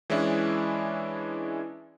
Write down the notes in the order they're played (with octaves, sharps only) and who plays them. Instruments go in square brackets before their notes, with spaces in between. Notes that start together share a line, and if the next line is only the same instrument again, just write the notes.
[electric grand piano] E3 G#3 C#4 D4 E4